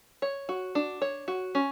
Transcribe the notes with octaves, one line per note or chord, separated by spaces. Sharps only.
C#5
F#4
D4
C#5
F#4
C#4